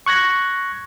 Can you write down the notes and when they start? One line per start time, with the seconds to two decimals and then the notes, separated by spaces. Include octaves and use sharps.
0.06 C#6 F#6 G#6 A#6